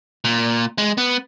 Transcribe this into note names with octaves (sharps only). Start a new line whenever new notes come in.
A#2
G#3
B3